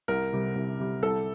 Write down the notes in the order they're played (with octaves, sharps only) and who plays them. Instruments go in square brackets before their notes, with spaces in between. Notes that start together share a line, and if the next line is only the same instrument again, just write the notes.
[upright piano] C2 [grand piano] A#4
[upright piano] C3 G3
C2
C3 G3
[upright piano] C2 [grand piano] A4